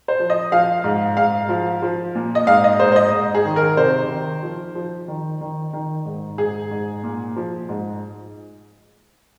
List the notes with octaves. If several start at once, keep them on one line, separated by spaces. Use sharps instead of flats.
C5
F3
D#5
F3 F5
G#2
G#2 F5
F3
F3
A#2
D#5
G#2 F5
D#5
G#2 C5
C5
D#5
G#2
G#4
D#3
A#4
C3 C5
D#3
F3
F3
D#3
D#3
D#3
G#2
G#2 G#4
G#2
A#2
F3
G#2